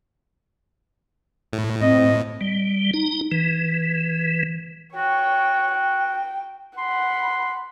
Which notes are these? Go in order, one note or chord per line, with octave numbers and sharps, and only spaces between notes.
A2
C4 D#5
G3
D#4
E3
F#4 C#5 G5
G5
F#5 B5 C6